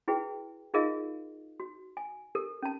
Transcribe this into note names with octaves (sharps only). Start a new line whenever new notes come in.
E4 F#4 G#4 B4 G5
D#4 F4 G#4 A#4 D#5 F5
F#4
G#5
G4 A4 A#4
C#4 A5